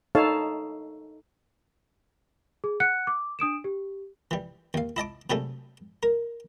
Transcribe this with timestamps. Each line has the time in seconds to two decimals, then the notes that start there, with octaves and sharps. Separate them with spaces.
0.15 D#4 A4 C#5 F5 A5
2.64 G#4
2.80 F#5 F#6 C#7
3.07 D6
3.39 D4 D#6 D7 E7
3.64 G4
4.31 E3 G3
4.74 D#2 F5
4.96 E4 D#5 A5 D6
5.30 C3 F#3 G3 A3 G#4 A4
6.03 A#4